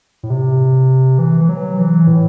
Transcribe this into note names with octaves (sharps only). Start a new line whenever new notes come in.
A2
C3
E3
E3
F#3
E3
A2